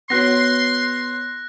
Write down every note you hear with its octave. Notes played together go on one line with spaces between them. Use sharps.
B3 F#4 C#5 C6 F#6 A#6